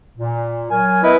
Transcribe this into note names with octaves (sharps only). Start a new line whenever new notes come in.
A#2
F#3 A#4 G#5
B3 E4 A#4 B4 D#5